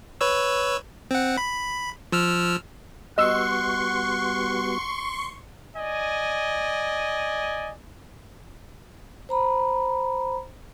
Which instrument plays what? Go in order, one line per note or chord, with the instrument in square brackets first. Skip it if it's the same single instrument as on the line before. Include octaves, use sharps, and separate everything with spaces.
[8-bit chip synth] B4 C#5 E6
C4 F#5
B5
F3 E6 F6
[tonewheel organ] G3 B3 F#4 [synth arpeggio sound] D#5 E6 [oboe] F#5 [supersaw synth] C6 C#6
[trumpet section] D5 D#5 G#5
[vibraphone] C5 A#5 B5